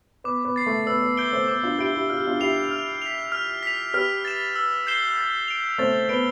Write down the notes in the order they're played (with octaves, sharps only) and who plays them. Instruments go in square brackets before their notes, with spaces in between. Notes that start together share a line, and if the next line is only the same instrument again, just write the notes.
[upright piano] B3 [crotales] D6
[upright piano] B3
[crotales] A6 C7
[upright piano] A3
[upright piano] B3 [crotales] E6
[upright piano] B3
[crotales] G6 D7 G7
[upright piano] A3 C4
[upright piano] B3 [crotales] D6
[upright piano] D4 F4
[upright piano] E4 G4 [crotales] G6 D7 G7
[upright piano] E4 G4
[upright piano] F4 [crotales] F6
[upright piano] G4
D4 F4
[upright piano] E4 G4 [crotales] C7 F7
[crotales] F6
B6 F7
F6
B6 F7
[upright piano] G4 B4 [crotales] F6
[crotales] A6 E7
E6
G6 C7 E7 G7
A6
D7 F7
[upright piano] A3 C4 [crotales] A6
[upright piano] B3 [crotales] D7 G7